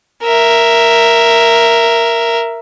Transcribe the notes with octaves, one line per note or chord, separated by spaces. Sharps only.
A#4 E5